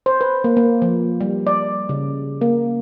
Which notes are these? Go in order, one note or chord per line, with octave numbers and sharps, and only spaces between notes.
C5
B4
A#3
A#3
F3
G3
D5
C#3
A#3